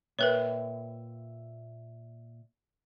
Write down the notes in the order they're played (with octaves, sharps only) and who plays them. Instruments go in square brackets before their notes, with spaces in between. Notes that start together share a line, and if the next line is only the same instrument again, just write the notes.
[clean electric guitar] A#2 E5 G5 [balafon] A#4 B4 C#5